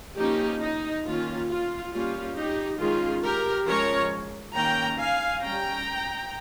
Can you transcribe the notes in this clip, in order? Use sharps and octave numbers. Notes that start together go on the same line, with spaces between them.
F3 A#3 C#4 D#4 G4
D#4
D#3 A#3 C#4 F4
F4
G3 A#3 C#4 F4
D#4 G4
D#3 G#3 C#4 F4 G#4
G4 A#4
F3 G#3 C#4 A#4 C#5
D#3 A#3 C#4 G5 A#5
F5 G#5
G3 C#4 G5 A#5